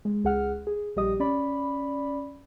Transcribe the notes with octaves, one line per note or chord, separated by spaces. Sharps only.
G#3
C#2 G#4 F#5 F6
G#4
A#1 G3 G4 D#5 D#6
C#4 D5 B5